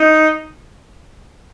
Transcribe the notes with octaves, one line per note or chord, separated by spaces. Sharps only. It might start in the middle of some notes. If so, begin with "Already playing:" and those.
Already playing: D#4